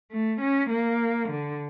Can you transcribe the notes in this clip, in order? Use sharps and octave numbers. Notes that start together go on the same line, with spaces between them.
A3
C#4
A#3
D3